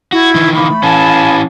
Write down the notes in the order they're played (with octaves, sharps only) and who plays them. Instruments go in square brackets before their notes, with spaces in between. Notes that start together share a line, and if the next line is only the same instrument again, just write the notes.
[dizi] E4 [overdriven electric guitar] F#4
[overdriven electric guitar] D#3 E3
[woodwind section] A#3 [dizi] B5
[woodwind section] A3
[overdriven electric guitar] E3 C#4 [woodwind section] F5 G#5 A5